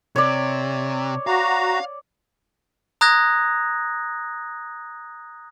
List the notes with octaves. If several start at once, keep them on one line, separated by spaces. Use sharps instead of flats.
C3 C#5 D5
F#4 F5 A#5
A#5 D#6 F#6 G#6 A#6